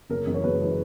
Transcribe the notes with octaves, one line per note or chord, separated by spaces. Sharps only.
F#1 A#4
F#2 E3 G#3
C#5
F#1 B4
E3 G#3